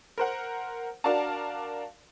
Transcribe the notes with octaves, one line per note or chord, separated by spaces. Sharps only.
A#4 C5 F#5
D4 F#4 A#4 D5 F5 A5